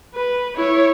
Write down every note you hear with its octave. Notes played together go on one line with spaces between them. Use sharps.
B4
E4 C#5